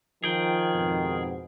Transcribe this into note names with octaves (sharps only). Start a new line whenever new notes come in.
D#3 F3 G#4 G5
F2 G#2 B2